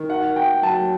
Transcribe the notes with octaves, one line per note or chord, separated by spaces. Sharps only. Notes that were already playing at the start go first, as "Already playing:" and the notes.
Already playing: D#3
F#5
G5
F#3 A5